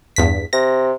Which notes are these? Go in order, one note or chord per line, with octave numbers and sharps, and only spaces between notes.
E2 G2 B6
C3 A#6